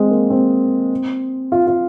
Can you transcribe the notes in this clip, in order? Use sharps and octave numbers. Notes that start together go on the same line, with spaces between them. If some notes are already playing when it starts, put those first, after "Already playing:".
Already playing: G#3 C4
A#3
C4
F4
F4